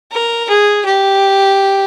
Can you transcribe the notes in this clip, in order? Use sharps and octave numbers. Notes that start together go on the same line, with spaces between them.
A#4
G#4
G4